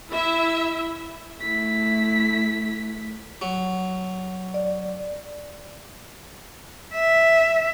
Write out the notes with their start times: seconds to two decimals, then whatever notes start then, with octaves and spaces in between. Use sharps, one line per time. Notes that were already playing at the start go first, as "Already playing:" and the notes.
0.11 E4 E5
1.41 A3 E4 B6
3.42 F#3
4.54 D5
6.94 E5